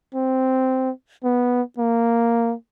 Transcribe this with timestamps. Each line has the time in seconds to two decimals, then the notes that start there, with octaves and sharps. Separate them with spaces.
0.15 C4
1.24 B3
1.78 A#3